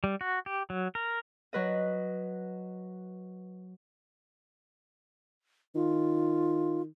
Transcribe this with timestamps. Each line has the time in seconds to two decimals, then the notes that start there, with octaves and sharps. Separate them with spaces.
0.04 G3
0.21 F#4
0.46 G4
0.70 F#3
0.95 A#4
1.53 F#3 B4 D#5
5.75 D#3 F4